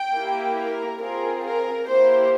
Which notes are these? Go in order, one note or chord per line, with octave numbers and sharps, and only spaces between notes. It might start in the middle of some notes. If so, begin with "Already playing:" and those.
Already playing: G5
A#3 E4 G4
A#4
C4 F4 G#4 A#4
A#4
A#3 E4 G4 C5